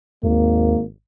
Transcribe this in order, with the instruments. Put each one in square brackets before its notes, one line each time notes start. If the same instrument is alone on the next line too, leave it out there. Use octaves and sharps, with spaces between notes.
[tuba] G#1 [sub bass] D#2 [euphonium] A#3